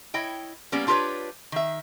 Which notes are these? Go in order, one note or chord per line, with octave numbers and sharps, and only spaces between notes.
E4 C#5 D#5 G5
G3 A#3 B3 C#4 D5
D4 F4 G4 A#4 B4 C#5
D#3 E5